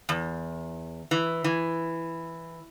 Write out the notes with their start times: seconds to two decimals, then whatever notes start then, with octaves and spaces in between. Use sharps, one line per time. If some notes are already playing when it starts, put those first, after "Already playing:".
0.09 E2
1.11 E3
1.44 E3